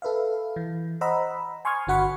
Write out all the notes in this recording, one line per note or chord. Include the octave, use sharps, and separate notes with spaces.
A4 B4 E5 F5
E3
C5 D#5 F#5 A#5 B5 E6
G#5 C6 C#6 D#6 F6 G#6
G1 D3 F#4 F#5 B5 C#6